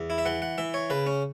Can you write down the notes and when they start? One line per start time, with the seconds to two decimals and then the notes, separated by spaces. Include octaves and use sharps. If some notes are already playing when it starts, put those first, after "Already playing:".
Already playing: E2
0.10 E4
0.18 E5
0.25 E3 F#5
0.42 F#5
0.58 E3 E5
0.74 C#5
0.90 C#3 B4
1.07 C#4